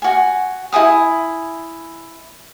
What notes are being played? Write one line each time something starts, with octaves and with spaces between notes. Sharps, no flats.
F#4 G#5
E4 A#4 G#5 D#6